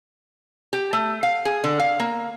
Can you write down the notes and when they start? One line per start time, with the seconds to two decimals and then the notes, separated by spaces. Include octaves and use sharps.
0.73 G4
0.93 A3
1.23 F5
1.45 G#4
1.64 D3
1.80 F5
2.00 A#3